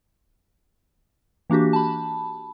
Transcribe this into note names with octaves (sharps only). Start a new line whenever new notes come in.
E3 A#3 D4 F#4 G4
A5 B5